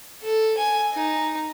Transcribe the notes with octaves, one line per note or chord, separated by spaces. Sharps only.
A4
G#5
D#4